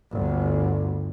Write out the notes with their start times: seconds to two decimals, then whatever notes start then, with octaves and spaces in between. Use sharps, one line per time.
0.12 G1 D2